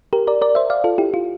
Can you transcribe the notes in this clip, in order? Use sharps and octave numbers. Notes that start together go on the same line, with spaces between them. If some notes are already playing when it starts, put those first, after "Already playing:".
G4 A#4
A#4 D5
A#4 D5
C5 E5
D5 F5
F4 A4
E4 G4
F4